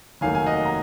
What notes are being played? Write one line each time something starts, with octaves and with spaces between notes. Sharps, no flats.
F1 D#2 D#3 F#3 F5 G#5
G#5
D#5 F#5
A#5